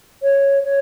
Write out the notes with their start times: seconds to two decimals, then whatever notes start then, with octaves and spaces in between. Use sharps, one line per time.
0.23 C#5
0.64 C#5